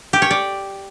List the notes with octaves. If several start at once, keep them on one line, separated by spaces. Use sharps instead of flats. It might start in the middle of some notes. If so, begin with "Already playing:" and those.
G4
C#5
D5